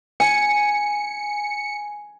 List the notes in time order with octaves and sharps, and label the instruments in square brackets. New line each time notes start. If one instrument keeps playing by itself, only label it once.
[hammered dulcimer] G#5 [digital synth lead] C#7